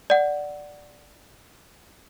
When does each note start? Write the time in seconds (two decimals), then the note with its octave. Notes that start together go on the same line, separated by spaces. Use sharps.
0.10 D5 F#5